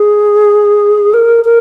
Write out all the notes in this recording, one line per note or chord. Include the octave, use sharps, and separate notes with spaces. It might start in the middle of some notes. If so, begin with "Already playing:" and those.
Already playing: G#4
A#4
A#4